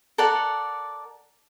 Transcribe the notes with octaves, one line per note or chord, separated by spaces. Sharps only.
A4 A#4 D5 F#5